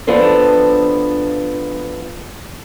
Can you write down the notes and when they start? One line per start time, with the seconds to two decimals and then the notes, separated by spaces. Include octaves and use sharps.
0.07 F3 B3 D4 A4 C5